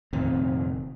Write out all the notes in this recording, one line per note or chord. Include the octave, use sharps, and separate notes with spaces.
F1 A#2 D#3 C4